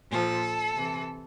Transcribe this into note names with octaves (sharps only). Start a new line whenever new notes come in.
A#2 F3 A4
C3 E3